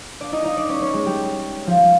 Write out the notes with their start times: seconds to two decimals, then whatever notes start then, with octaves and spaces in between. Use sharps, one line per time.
0.21 D4 D5
0.32 D#4 D#5
0.45 D#4 D#5
0.57 D4 D5
0.69 C#4 C#5
0.81 C#4 C#5
0.93 G#3 G#4
1.06 G3 G4
1.67 F3 F4